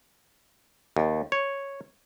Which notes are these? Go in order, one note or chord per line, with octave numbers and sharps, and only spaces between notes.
D#2
C#5